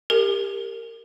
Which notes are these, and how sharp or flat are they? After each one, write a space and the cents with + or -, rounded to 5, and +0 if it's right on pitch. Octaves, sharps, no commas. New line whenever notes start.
G4 +15 A#4 -20